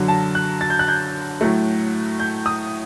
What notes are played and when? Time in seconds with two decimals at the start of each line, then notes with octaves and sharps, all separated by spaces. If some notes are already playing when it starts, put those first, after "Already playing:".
Already playing: F#2 D3 F#3
0.08 A5
0.35 F#6
0.61 A6
0.70 G6
0.79 F#6
0.88 G6
1.41 A2 F#3 A3
2.20 G6
2.46 D#6